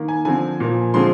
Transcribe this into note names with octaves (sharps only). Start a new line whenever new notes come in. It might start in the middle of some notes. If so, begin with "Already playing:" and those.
Already playing: D#3 A#3
G#5
D3 F3 C4 G#5
A#2 F3 A#3
D3 F3 G#3 C4 C6